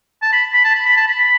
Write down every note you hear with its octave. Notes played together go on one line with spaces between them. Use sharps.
A5
B5
B5
A5
B5
B5
A5
B5